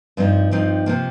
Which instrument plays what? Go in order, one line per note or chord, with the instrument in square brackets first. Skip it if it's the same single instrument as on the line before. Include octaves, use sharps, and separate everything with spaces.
[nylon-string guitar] G2 F3 C4 D#4
G2 F3 C4 D#4
C3 F3 A#3